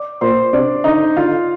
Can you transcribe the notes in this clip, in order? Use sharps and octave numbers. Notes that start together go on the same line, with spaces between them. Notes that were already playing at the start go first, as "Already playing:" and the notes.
Already playing: D5 D6
A#2 C5 C6
C3 D4 D5
D3 D#4 D#5
D3 F4 F5